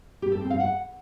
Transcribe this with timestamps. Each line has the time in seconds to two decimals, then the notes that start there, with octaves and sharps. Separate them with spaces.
0.22 G4
0.32 A4
0.41 C4
0.50 F5
0.60 F#5